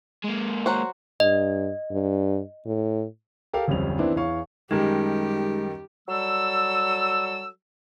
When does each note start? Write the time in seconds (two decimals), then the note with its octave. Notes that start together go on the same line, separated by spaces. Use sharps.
0.24 G#3 A#3
0.66 F#3 F#4 C5
1.20 G2 D#5
1.90 G2
2.66 A2
3.53 G4 A4 A#4 F5
3.68 D1 A1 F2 G3 F7
3.99 D#3 E3 B3 C4 D4 E4
4.16 E2 E3 C#5 F5 C#6
4.71 F#2 D#3 G3 G#3 D#4 G4
6.08 F#3 G3 A4 E6